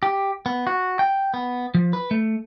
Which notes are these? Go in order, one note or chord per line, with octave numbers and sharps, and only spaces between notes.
G4
B3
F#4
G5
B3
F3
B4
A3